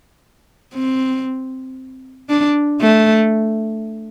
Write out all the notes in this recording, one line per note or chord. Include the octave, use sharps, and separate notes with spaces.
C4
D4
A3